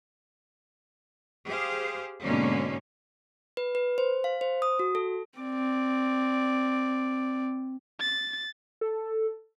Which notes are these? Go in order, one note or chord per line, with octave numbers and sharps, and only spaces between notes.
G4 G#4 C5 F5
G#2 B2 D3 A#3 C#4
B4
B4
C5
F5
C5
D#6
F#4
A4
C4 D5
A6
A4